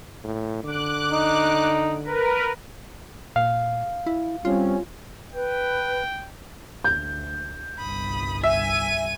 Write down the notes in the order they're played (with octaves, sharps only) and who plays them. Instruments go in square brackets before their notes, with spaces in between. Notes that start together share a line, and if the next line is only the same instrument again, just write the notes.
[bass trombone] A2
[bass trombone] D3 [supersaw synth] D6 F#6
[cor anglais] D#4
[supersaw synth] A#4 B4
[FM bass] A#2 [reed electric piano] F5
[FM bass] E4
[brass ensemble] G3 C4 C#4 [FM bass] F4
[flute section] B4 [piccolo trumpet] G5
[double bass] D2 [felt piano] G6
[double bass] G1 C2 [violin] B5 D#6
[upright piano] E5 [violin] G#5 D#7